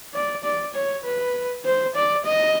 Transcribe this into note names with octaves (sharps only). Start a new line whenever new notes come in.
D5
D5
C#5
B4
C5
D5
D#5